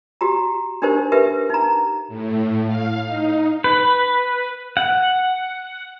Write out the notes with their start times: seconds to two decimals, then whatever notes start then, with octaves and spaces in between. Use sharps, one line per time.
0.21 F#4 G4 A#5
0.82 D4 D#4 G4 A#4 C5
1.12 G4 A#4 B4 E5
1.50 D#4 A#5
2.08 A2
2.67 F5
3.05 D#4
3.64 B4
4.77 F#5